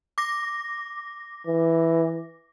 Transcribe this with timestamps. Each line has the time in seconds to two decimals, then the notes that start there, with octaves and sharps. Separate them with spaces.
0.18 D6 A#6
1.47 E3